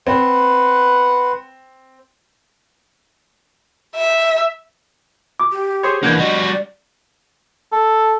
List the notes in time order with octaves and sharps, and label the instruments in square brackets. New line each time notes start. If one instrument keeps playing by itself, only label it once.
[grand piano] C4 [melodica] B4 F#5 C6
[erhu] E5
[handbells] D6
[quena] G4
[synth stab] G#4 C5 C#5
[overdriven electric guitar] E3 A#3 [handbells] D4 G6 G#6 [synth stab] F#5
[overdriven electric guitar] G3 F#4 [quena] D#5
[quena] D5
[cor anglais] A4